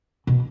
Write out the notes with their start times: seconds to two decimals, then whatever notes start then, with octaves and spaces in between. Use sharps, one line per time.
0.27 B2